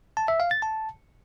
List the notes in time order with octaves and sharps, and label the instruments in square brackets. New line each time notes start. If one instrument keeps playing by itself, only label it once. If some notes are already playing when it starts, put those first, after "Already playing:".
[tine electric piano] A5
E5
F5
A6
A5